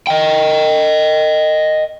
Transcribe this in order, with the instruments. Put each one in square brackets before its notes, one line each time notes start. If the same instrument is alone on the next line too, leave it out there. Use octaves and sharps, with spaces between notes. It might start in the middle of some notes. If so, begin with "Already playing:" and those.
[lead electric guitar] D#5 G5